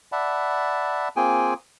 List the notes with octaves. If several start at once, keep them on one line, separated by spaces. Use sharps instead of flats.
D5 E5 F#5 A5 B5
A#3 C4 F4 G#4 G5 G#5